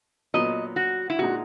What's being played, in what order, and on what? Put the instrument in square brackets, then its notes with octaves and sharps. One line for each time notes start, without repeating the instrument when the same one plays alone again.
[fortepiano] A#2 F#3 B3 [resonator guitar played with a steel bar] D#5
[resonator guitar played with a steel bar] F#4
E4
[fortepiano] A#2 G#3 D#4 [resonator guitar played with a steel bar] F#4